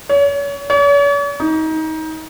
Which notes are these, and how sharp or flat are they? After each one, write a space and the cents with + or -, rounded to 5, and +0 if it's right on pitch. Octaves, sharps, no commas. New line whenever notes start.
C#5 +35
C#5 +45
D#4 +25